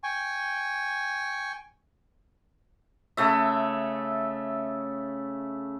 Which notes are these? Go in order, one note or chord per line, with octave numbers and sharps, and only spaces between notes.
G5 G#5 C#6
C#3 A3 E5